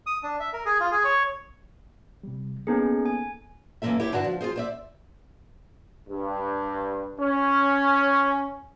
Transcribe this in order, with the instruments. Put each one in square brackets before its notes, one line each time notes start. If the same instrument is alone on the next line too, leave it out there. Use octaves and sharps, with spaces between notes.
[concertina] D#6
D4
E5
A#4
G#4
F4
G#4
C#5
[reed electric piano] C3 G3
[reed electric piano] A#3 B3 A4 [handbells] C#4 D#4 G#4
[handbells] G#5
[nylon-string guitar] F#2 E3 A#3 C4 A4 E5
E4 G4 A4 C5 C#5
G2 D3 F#4 D5 A5
F3
F4 G4 G#4 C5
C5 D5 E5
[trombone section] G2
C#4